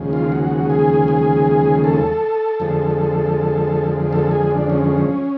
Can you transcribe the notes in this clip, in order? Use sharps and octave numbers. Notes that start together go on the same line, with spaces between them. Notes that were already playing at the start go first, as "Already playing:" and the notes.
Already playing: D#2 C#3 F3 G#3
F4
F#4
G#4
G#4
A4
F2 D3 F3 G#3
A4
G#4
D4
C#4